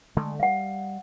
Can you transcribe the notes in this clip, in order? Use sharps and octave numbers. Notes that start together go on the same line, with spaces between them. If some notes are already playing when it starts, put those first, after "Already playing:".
D3 G#3 A3
G3 F5 F#5